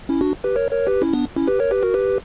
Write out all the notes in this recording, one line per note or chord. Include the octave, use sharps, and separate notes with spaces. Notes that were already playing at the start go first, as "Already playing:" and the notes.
C#4 E4
D4 F#4
G4 B4
A#4 C#5
A#4 C#5
G4 B4
C#4 E4
B3 D4
C#4 E4
G4 B4
A#4 C#5
G4 B4
F#4 A#4
G4 B4